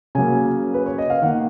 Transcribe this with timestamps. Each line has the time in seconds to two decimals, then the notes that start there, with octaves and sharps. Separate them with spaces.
0.15 C#3 F#3 A#3 G#5
0.74 B4
0.86 C#5
0.98 D#5
1.10 F5
1.22 D#3 A#3 F#5